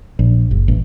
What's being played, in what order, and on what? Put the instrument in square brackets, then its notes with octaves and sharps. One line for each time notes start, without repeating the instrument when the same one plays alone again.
[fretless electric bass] A#1
F#1
A1